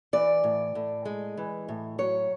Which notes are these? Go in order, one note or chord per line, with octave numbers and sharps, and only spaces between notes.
E3 D5
A2
A2
G#3
E3
A2
F#3 C#5